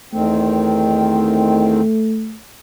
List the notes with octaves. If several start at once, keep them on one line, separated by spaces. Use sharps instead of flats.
E2 D#3 A3 C4